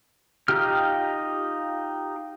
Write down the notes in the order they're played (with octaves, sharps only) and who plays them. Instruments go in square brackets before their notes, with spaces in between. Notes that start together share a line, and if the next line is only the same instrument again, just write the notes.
[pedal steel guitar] D#4 F4 G4 F6